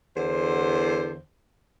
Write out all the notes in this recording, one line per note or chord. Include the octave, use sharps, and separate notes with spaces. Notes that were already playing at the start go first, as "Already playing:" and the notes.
E2 D3 C5